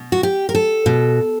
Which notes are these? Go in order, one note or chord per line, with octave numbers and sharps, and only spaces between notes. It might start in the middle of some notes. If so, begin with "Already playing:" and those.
Already playing: B2
F#4
G4
A#4
A4
B2